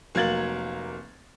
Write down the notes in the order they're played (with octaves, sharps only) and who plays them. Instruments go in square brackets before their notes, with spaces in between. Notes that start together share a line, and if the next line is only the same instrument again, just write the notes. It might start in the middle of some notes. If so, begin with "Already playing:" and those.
[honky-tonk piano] F1 F#3 A#3 G#6 A6 F#7